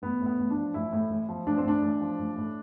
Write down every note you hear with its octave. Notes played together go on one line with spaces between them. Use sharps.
A1 B3
A2
B3
A1
D4
F3
A1 E4
A2
A1
F3
A1 D4
C4
A2 D4
A1
F3
A1
A2